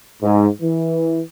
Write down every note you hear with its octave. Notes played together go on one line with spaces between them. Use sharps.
G#2
E3